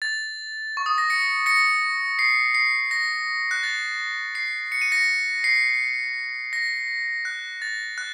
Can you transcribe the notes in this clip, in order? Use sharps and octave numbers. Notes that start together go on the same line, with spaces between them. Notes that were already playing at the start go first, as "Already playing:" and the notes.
A6
C#6
D#6
A#6
A#6 C#7
A#6 C#7
C7
C7
A#6
F#6
A6
C7
C#7
D#7
A#6 C#7
C7
A#6
F#6
A6
F#6